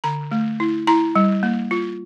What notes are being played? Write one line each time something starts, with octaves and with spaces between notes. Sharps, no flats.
D3 A#5
A3
E4
E4 A#5
G3
A#3
F4